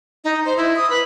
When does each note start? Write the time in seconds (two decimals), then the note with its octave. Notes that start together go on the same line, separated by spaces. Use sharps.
0.24 D#4
0.45 C5
0.57 E4
0.76 D#6
0.90 B4